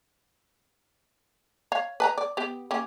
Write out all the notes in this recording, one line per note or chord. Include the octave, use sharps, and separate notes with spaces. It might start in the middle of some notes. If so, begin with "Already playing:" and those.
C#5 F5
B4 A5 A#5
D5
B3 G4
A#3 C#4 G4